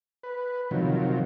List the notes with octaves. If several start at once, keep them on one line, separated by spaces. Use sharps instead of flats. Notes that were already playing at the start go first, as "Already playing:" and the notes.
B4
C3 D#3 F3 F#3